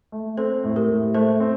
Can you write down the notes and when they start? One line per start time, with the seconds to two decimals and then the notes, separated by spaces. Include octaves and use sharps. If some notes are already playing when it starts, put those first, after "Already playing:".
0.12 A3
0.37 C4 A4 C5
0.64 A2
0.76 G4 A#4
0.89 A2
1.14 A3 A4 C5
1.40 C4